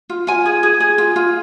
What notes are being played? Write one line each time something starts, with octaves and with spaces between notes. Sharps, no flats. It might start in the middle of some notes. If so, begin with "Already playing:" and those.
F4
F4 G#5
G#4
G#4
G#4
F4
F4